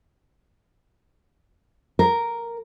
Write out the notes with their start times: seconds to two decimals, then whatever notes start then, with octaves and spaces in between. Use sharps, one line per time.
1.99 A#4